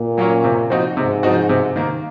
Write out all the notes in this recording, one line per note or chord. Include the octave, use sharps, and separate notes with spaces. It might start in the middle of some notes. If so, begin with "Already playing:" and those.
Already playing: A#2
F#3 A#3 C#4
C3
F3 C4 D#4 F#4
G#2 C3
F3 C4 D#4 F#4
C3
D#3 A#3